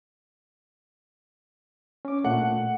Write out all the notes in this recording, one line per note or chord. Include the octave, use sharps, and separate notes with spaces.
C#4 D6
A#2 A3 F#5